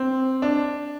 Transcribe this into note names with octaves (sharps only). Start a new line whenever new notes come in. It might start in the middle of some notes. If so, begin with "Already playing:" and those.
Already playing: C4
D4